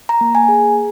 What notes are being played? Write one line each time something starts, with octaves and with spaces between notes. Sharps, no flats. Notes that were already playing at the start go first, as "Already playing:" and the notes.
A#5
A#3
G#5
G#4